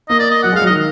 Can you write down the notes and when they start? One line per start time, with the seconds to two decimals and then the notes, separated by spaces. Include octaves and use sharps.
0.09 A#3 D#5
0.19 D5
0.30 D#5
0.43 F#3 F#5
0.52 G#3
0.56 F5
0.61 F#3
0.66 D#3 D#5